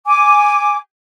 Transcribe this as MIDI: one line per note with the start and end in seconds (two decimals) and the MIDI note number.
0.07 0.77 80
0.07 0.77 86